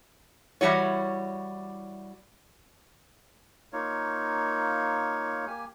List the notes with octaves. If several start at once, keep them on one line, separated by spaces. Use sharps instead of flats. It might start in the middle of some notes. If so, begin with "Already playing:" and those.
E3 G3 F#4 C#5
A#3 D#4 F4 C#5
A#3 G4 G#5